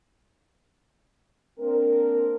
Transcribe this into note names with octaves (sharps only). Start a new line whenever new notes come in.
A#3 C4 D4 A#4